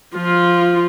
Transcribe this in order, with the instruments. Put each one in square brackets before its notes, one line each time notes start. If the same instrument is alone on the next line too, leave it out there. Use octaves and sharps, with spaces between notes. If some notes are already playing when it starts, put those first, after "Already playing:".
[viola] F3 F4